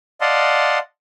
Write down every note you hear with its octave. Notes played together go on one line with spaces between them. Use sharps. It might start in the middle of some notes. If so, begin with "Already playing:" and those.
D5 D#5 F5 F#5 A5 C6